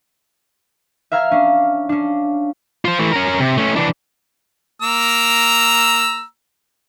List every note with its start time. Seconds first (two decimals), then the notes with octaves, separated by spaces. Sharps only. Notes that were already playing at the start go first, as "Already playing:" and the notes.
1.12 E5 F5 A#5 F6 G#6
1.32 C#4 D4
1.89 C#4 D4
2.85 F4 C5
2.99 E3 A3
3.12 C#4 A#4
3.40 C3
3.57 A3 C#4
3.76 E3 D4
4.81 A#3 A#5 E6